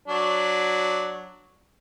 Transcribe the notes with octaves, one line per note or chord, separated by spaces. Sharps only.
F#3 D4